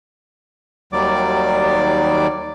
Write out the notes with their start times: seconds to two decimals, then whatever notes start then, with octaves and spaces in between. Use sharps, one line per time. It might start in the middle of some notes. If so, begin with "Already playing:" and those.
0.93 D#2 D#3 F#3 G3 D5 D6